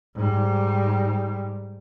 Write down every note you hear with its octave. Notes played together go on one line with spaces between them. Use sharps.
G#2 G3